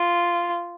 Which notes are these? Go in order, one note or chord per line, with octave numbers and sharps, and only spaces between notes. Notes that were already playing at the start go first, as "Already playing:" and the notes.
Already playing: F4